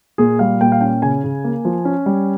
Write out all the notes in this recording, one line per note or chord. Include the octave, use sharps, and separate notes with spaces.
A#2 G#4
G3 F5
A#2 G5
F5
C#4 G5
C#3 G#5
C#3
A#3
F3
C#4
G3